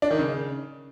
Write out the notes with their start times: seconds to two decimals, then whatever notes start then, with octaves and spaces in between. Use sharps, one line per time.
0.02 D4
0.10 D#3
0.19 C#3